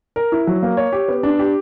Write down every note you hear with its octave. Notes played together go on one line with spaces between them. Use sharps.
A#4
E4
F#3
A#3
C#5
G4
B3
D4
G4